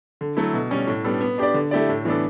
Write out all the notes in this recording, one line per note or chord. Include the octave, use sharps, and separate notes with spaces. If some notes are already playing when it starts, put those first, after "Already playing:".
D3
F#3 A3 E4
B2
G3 C#4
A2
G3 B3 D4 A4
B3
D4 G4 D5
D3
A3 E4 G4 D5
A2
E3 B3 D4 A4